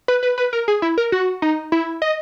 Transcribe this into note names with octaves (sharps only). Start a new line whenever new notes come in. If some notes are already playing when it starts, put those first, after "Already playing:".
B4
B4
B4
A#4
G#4
E4
A#4
F#4
D#4
E4
D#5